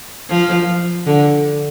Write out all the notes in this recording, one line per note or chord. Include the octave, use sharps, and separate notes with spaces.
F3
D3